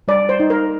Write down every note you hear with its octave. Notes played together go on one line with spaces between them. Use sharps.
G3 D5
C5
D#4
A#4